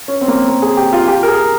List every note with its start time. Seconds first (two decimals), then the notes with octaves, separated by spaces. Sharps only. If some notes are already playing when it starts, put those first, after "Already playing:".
0.08 C#4
0.21 C4
0.28 A#3
0.48 A#3
0.62 G#4
0.77 G4
0.93 F4
1.08 G4
1.23 A#4
1.28 G#4